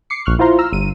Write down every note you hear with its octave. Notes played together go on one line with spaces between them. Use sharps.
D6 C7 C#7
A#1 C#6 F6 F#6
E4 F4 C5 F5 A#5 C6
A#5 E6 F6
G1 D#7